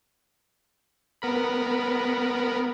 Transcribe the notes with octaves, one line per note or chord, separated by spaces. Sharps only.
B3 A#4 B5